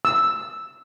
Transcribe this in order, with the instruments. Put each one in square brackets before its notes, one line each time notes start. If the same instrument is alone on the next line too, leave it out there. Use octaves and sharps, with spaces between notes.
[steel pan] E6